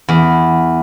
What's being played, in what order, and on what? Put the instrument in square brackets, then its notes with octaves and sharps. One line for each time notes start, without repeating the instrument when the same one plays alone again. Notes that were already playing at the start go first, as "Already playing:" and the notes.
[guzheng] E2